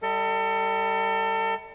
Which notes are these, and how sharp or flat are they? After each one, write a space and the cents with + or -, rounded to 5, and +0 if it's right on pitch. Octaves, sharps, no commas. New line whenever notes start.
G3 +0 A4 +35 D#5 +45